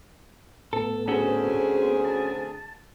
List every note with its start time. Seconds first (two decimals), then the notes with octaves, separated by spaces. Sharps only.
0.73 A2 B3 A4
1.08 D2 C4 C#4 F#4 G#4 A4
1.83 B3 C5
2.05 A5